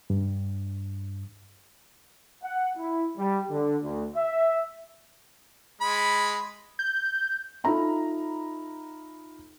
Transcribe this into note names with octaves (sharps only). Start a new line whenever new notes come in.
G2
F#5
E4
G3
D3
D2
E5
G#3 B5
G6
D#4 F4 A4 E5 A#5 B5